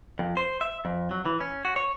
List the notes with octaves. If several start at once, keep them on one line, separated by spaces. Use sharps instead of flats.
F2
C5
E5
F2
F#3
E3
C#4
F#4
C#5